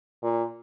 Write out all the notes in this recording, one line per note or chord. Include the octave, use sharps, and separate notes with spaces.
A#2